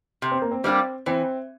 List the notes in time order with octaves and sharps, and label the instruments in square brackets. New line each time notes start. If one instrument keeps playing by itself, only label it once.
[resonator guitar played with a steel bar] C3
[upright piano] C4
A#3
C4
[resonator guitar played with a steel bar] G3 A#3 D4 G4 [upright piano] C4
[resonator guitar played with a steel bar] E3 [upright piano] C4